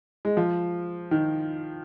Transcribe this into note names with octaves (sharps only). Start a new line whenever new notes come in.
G#3
F3
D#3